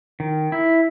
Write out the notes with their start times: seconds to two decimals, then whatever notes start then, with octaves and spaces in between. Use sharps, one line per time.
0.20 D#3
0.52 E4